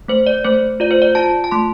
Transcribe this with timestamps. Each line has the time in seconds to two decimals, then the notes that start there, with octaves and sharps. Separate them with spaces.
0.08 A3 C5
0.27 D5
0.45 A3 C5
0.80 F4 D5
0.91 C5
1.02 D5
1.15 F4 A5
1.44 A5
1.51 A3 C6